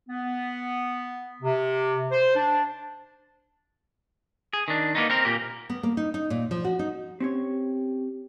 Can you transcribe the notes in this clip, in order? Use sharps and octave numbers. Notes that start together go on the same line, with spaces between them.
B3
C3
C5
D4
G#4
D#3 D4
A#3 B3 D#4
C4 A#4
A#2 A#3 G4
B3
A#3
D#4
D#4
A#2
F3
F#4
D#4
C4 C#4 G4 C#5